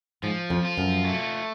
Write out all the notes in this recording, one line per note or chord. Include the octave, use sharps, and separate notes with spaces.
G#2 F3
F2
F4
F#2
A3